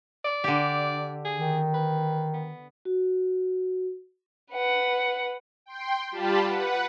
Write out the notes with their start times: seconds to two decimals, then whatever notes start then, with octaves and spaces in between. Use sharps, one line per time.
0.25 D5
0.44 D3 G4
1.25 G#4
1.39 D#3
1.74 B4
2.34 B3
2.85 F#4
4.52 B4 F#5
5.66 G5 C6
6.11 G3 F4 G4 A5 B5
6.45 B4 F#5